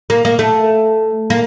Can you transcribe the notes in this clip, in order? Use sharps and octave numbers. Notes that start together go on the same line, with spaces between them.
A#3
A#3
A3
A#3